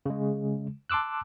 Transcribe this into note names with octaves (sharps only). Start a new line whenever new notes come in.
C#3 G#3
A5 C6 D6 E6 F#6